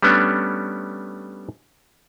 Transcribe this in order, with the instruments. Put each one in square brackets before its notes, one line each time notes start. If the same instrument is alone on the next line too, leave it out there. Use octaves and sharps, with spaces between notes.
[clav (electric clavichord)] G3 A3 B3 C#4 D4